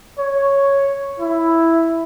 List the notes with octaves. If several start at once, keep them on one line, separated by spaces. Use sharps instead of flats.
C#5
E4